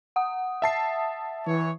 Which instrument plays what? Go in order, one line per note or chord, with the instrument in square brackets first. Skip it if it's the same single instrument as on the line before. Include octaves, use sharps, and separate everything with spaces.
[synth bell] F#5 D#6
[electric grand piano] E5 A5 C7
[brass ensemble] E3 C#5